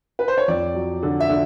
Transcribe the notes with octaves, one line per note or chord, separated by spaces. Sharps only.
B4
C5
C#5
F2 D5
F#3
D3
E5
D3